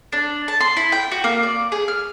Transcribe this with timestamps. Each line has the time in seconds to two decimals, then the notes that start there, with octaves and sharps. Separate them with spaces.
0.12 D4
0.48 A5
0.60 C6
0.77 E4
0.92 G5
1.11 F#4
1.24 A#3
1.43 D5
1.72 G#4
1.88 F6